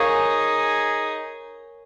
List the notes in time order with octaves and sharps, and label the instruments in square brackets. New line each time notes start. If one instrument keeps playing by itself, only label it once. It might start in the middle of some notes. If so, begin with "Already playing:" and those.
Already playing: [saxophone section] D#4 G#4 [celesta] A#4 C#5 F5 G#5 C#6